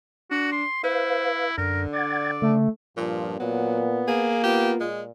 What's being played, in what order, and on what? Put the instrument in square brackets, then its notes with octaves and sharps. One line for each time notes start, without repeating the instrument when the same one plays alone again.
[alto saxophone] D4 [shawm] F#4
[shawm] C6
[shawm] E4 [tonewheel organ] B4 F5 [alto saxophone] C5
[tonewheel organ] F#2 [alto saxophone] D3 [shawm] A#4
[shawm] D5 [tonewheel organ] F#5 G#6 A6
[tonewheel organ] C#3 [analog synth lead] A3
[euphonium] G2 [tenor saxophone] A#2 [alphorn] F3
[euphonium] A#2 [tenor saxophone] F#3 [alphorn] B3
[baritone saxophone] A#3 [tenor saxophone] G#4
[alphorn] B3 [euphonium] F4 [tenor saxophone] G4
[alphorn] A#2 [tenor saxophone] G#3